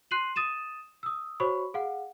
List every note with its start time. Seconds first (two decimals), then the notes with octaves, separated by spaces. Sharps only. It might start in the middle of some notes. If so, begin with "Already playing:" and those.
0.11 C6 F#6 C7 D#7 F#7
0.36 D#6 A6 D#7 E7
1.03 D#6 E6
1.40 F#4 C5 C#5 B5 C#6
1.74 G#4 F5 F#5